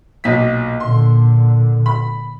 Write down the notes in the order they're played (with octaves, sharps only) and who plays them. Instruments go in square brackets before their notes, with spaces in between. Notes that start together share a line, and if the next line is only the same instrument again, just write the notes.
[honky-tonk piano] B1 A#2 B6
[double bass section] A#2 D3 [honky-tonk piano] C6
[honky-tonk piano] B5